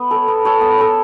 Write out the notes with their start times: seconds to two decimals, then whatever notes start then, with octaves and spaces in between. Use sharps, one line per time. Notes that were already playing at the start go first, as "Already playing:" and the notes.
Already playing: B3
0.11 A4 C#5
0.28 B3
0.45 A4 C#5
0.61 B3
0.78 A4 C#5